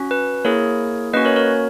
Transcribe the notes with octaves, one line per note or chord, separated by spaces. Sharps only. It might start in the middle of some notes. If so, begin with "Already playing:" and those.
Already playing: C#4 F#4
B4
A#3 E4 G#4 A#4 C#5
A#3 C#4 F#4 B4 D#5
A#4 C#5
A#4 C#5